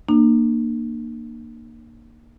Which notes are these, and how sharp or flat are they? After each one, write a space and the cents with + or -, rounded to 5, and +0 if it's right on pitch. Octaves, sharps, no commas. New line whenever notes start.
A#3 +0 D4 +40